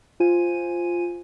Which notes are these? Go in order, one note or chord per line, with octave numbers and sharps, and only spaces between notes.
F4 C5 G#5 D#7